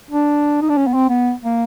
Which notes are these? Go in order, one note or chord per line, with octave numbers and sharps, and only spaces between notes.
D4
D#4
D4
C#4
B3
C4
B3
A#3